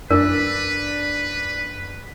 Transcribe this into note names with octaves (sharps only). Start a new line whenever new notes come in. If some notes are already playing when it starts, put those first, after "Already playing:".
F#2 D4 A#4 B4